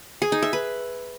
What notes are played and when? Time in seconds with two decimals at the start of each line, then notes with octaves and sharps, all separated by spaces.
0.22 G#4
0.32 D#4
0.42 E5
0.53 B4